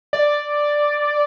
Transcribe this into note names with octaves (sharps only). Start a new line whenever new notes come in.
D5